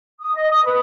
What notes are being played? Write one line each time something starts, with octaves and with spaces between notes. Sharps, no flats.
D#6
D#5
D#6
B4